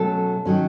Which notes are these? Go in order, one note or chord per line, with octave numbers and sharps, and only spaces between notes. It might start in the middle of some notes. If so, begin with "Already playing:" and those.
Already playing: B2 F#3 A3 C#4 A4
D#3 F#3 C#4